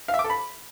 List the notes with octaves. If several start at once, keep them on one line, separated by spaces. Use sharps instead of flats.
F5
E5
D6
A4
B5